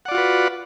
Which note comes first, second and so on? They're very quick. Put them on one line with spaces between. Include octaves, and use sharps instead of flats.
F#5 D5 F4 F#4 B4